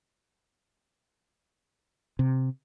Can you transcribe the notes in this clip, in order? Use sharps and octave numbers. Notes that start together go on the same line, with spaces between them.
C3